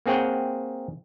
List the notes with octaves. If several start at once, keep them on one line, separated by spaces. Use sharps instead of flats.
A#3 C4 G#4 C#5 F#5 G5